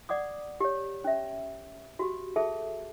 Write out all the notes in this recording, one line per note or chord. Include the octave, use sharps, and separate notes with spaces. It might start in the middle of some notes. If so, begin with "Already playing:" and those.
D5 F#5 D6 D#6
G4 C#5
C#4 E5
F#4 G4
G#4 A4 E5 A5